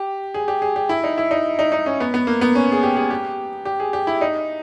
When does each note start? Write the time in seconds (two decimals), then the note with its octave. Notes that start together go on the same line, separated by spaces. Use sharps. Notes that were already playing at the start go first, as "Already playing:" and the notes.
Already playing: G4
0.34 G#4
0.48 G4
0.62 G#4
0.76 G4
0.89 E4
1.04 D#4
1.18 E4
1.31 D#4
1.59 D#4
1.72 D#4
1.86 C#4
2.00 B3
2.14 B3
2.27 A#3
2.41 B3
2.55 C#4
2.72 G#4
2.83 G4
2.96 G#4
3.10 G4
3.65 G4
3.80 G#4
3.93 G4
4.07 E4
4.21 D#4